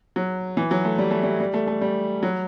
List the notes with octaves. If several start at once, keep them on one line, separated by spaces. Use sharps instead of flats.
F#3
E3
F#3
A3
G3
A3
G3
G3
A3
A3
G3
F#3